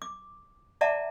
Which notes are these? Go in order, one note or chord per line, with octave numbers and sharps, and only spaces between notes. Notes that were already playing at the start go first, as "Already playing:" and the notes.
D6
D5 E5 F#5 A5 A#5 D6